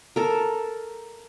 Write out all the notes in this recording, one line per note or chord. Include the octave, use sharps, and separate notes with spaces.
A4 A#4